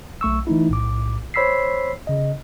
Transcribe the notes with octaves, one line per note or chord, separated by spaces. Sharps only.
B1 A3 C#6 E6
E3 A3 D#4 E4
B1 A2 D6
C5 C#5 B5 E6 B6 C7
C#3 D#5